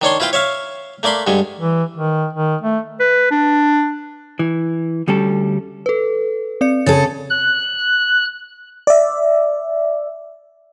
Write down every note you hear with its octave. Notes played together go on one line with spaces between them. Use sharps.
D#3 D4 C#5 C6
E4 F4 B4 F5 G5
C#5 E5 F5
A3 A#3 D5 B5 C6
G2 D3 G#3
E3
D#3
D#3
A3
B4
D4
E3
D2 G3 C#4 A4
A4 B4
C4 D5 C#7
C#3 G#4 A4 A6
F#6
D5 E5